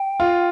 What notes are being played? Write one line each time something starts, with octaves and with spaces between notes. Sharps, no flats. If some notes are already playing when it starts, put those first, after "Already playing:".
Already playing: G5
F4